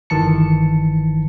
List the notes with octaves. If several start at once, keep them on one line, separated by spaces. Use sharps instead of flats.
G1 D#3 E3 A5 C#7